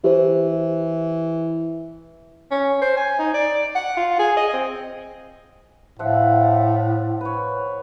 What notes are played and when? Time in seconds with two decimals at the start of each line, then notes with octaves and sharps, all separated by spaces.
0.04 E3 G4 C5
2.51 C#4
2.81 C5
2.97 G#5
3.18 D#4
3.34 D5
3.75 F#5
3.97 F4
4.19 G#4
4.37 D#5
4.53 C4
5.99 A2 F3 E5 F#5
7.21 B4 C#5